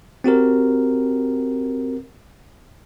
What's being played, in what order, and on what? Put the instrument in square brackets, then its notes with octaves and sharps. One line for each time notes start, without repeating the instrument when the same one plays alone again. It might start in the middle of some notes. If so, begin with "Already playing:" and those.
[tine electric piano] C4 F#4 G4 A#4